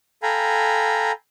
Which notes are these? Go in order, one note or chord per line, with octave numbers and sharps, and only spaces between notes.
A4 F5 G5 G#5 A#5 B5